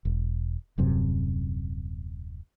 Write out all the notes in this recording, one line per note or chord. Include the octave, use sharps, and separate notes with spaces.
E1
D#1 F#2 C3